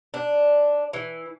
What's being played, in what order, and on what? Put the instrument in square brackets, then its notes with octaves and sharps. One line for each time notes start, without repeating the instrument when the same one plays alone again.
[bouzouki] D4
E3